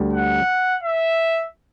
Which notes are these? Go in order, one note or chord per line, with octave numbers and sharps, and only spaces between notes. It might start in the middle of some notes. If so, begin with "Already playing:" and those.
Already playing: D2 D3 G3
F#5
E5